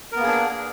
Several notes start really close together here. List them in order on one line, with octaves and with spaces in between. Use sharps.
A#4 B3 A#3 G#4 D4